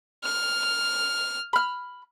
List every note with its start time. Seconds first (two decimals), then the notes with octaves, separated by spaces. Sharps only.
0.24 F6
1.53 B5 F6